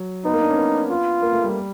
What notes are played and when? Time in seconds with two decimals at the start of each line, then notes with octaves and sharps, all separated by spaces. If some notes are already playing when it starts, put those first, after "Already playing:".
Already playing: F#3
0.25 B3 D#4
0.33 A#3
0.42 D4
0.49 C#4
0.57 B3
0.90 F4
1.22 A#3
1.33 A3
1.44 G3